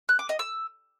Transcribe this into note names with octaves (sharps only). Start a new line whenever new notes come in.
F#6
D6
D#5
E6